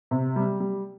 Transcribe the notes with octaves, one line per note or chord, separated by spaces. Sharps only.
C3
G3
G3